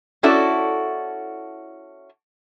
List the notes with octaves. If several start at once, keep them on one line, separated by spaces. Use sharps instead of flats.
C#4 E4 F#4 A4 D5